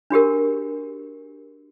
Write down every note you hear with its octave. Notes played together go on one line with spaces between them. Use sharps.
D4 F#4 G4 A#4